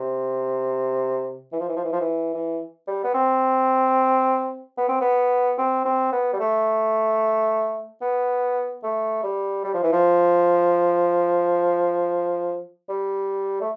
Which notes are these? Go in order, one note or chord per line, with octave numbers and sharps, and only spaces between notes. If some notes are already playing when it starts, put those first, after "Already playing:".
Already playing: C3
E3
F3
E3
F3
E3
F3
E3
E3
G3
B3
C4
B3
C4
B3
C4
C4
B3
G3
A3
B3
A3
G3
G3
F3
E3
F3
G3
A3